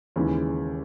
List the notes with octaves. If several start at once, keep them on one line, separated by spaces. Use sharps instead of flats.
D#2 C#3 E3 G#3 C#4